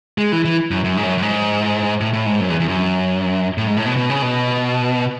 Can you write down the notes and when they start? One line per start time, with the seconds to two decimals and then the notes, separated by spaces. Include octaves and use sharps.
0.18 G#3
0.32 E3
0.45 E3
0.71 F#2
0.84 F#2
0.97 G#2
1.03 F#2
1.18 F#2
1.23 G#2
2.01 A2
2.13 A2
2.26 G#2
2.40 F#2
2.50 E2
2.60 E2
2.69 F#2
3.58 A2
3.67 G#2
3.77 A2
3.86 B2
3.96 B2
4.10 C#3
4.22 B2